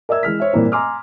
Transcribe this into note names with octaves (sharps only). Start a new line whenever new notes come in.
A#4 D5 E5 E6 G#6
E3 G#3 F6 B6
C5 C#5 E5
G2 A#2 E3 A#3 C4
G#5 A#5 C6 D6 E6 F6